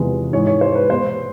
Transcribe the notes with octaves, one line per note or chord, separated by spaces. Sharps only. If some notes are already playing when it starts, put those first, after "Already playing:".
Already playing: E2 C3 F3 G#3 B3
G#2 E3 G#3 C#5
C#5
C5
B4
B2 G#3 B3 C5